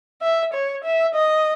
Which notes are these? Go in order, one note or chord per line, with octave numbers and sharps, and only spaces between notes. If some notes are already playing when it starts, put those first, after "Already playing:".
E5
C#5
E5
D#5